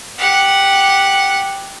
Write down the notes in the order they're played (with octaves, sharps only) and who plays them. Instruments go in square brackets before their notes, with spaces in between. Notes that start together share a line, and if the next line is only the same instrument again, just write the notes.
[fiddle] G4 F#5